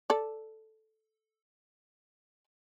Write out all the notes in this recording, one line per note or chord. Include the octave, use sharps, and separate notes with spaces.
A4 D5